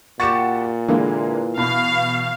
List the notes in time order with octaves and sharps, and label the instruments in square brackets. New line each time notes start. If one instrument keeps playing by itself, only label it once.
[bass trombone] A#2 [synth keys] F#4 G4 [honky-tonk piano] A6 C#7 E7
[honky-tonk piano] D3 G#3 A#3 [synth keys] E3
[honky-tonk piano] B2 B5 [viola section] F5